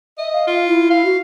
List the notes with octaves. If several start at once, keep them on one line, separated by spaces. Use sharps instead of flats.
D#5 E5
F5
F4
E4
F5
F#4